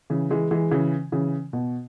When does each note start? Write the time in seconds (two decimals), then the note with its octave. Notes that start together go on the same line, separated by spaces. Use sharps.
0.10 C#3 E3
0.31 E3 G#3
0.51 E3 G#3
0.71 C#3 E3
1.12 C#3 E3
1.53 B2